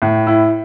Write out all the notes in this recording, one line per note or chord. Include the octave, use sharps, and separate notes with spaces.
A2
E4